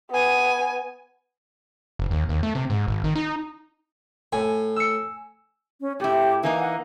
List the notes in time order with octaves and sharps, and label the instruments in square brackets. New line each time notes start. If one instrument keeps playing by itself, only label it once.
[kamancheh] B3 G#5
[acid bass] F#1
D#2
D#2
A3
C3
G#2
G#1
D#3
D#4
[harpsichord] A2 [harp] G#5
[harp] E6 C#7
[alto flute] C#4
[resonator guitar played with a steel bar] A2 E4 [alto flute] G4
[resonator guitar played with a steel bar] E3 A#3 D#4 [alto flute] G#5
[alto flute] F#5